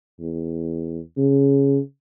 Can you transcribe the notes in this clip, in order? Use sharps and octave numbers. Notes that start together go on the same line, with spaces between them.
E2
C#3